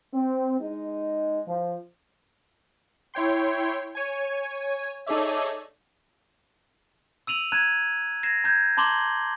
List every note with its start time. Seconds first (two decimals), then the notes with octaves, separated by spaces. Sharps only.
0.13 C4
0.60 G#3 D#4
1.47 F3
3.14 E4 C#5 G5 C6
3.95 C#5 G#5
5.06 D#4 G#4 A4 C#5 D5 E5
7.27 E6 D#7 F7 F#7
7.52 A#5 F#6 G#6 D#7
8.23 G#6 A#6 C7 E7
8.44 A#5 G6 G#6
8.77 A5 A#5 C6 D6 F#7 G7